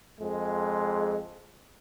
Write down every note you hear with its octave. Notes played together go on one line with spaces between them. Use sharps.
F2 G#3